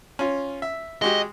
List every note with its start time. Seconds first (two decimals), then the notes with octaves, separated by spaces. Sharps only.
0.19 C#4 F4
0.62 E5
1.02 G#3 F#4 G4 D#5